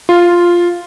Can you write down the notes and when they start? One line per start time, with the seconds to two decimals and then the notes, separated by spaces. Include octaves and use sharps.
0.09 F4